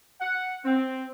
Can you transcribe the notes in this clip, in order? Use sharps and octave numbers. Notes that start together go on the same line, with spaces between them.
F#5
C4